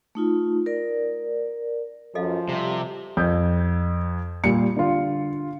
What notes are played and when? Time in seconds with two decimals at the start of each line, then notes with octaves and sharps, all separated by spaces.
0.15 A3 D#4 F4
0.66 A#4 D5
2.15 F#2 F3 A4 D#5 F5
2.49 C3 G3
3.17 F2 G6
4.44 A#2 G3 C#7
4.76 D3 F4